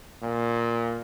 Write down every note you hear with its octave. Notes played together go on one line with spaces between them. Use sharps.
A#2